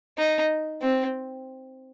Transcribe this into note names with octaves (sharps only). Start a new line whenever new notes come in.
D#4
C4